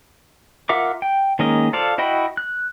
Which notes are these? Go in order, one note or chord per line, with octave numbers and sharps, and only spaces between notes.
F4 A#4 E5 F#5 D6
G5
D#3 G#3 A#3 C#4 D#5
F4 A4 C5 D5 F5
E4 F#4 D#5 G5 B5
F#6